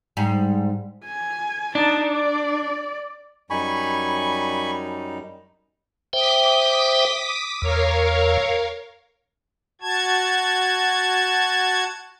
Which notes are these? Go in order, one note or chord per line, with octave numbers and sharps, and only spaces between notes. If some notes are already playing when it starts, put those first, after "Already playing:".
G#2 G3
G#5
D4 D#4 A5
D5
F#2 G3 D#4 G#5 B5 C#6
C5 E5 G5 D6 D#6 B6
E2 A#4 C#5 F5
F#4 A5 G#6